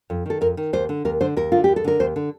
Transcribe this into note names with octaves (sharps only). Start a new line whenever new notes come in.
F2
D#3 A4
F2 A#4
D#3
D#2 C5
D3
D#2 A#4
D3 C5
D#2 A#4
D3 F4
D#2 G4
A4
D3 A#4
D#2 C5
D3